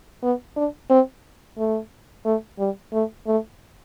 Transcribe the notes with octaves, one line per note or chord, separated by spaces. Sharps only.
B3
D4
C4
A3
A3
G3
A3
A3